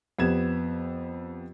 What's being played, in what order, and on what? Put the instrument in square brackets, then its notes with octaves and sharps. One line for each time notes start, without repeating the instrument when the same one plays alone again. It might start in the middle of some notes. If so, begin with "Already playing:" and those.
[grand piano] F2 B3 G4 G#6 E7